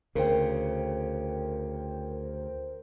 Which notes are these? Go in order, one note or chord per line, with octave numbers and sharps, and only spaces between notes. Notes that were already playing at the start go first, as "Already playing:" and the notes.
D2 C#3 A#4 C5 G5